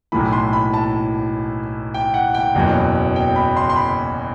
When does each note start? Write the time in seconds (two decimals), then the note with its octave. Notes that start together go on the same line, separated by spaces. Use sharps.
0.12 B1 A2 E3 B5
0.32 C6
0.53 B5
0.74 A5
1.94 G5
2.14 F#5
2.34 G5
2.55 F#1 E2 B2 F#3
3.16 G5
3.36 B5
3.56 C6
3.69 C6
3.76 B5